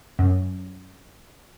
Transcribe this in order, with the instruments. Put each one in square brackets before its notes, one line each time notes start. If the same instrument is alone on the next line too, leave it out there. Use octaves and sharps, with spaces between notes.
[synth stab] F#2